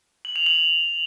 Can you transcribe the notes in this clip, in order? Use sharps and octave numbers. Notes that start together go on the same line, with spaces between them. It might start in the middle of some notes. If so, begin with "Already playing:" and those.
F#7
F7
F#7